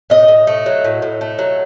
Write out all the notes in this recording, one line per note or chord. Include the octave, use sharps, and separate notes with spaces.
A2 D#5
A2
A3
F#3
A2
A2
A3
F#3